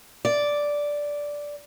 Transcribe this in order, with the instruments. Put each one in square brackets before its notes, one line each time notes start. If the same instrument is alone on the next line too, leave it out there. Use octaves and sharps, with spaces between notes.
[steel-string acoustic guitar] D5